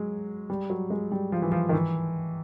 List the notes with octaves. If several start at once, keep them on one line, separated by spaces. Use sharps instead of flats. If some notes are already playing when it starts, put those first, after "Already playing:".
Already playing: F#3 G#3
G3
F#3
G#3
G3
F3
E3
F3
D#3
E3